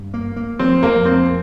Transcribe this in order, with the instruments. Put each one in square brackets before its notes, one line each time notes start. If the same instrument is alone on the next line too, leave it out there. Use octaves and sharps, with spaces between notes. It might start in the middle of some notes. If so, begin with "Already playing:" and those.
Already playing: [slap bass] G2
A#3
A#3
[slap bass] F3 [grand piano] C4
[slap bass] F2 [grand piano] A#3
[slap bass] F3 [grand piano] C4